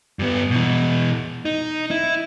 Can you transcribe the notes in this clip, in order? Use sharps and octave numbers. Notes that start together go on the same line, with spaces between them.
G2 B3
B2 E3
D#4
E4